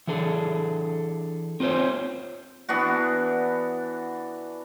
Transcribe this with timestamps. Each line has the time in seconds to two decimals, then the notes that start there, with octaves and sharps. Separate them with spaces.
0.07 E3 D4 G#4 A4
1.60 C4 F4 F#4 C5 C#5
2.69 E3 B3 D4 F#4